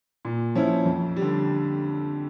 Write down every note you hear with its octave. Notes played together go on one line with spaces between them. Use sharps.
A#2
F3 C#4 E4
F2
G3
D3